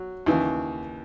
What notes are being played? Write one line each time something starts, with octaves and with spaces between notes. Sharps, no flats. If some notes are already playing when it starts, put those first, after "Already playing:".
Already playing: F#3
D#2 C#3 E3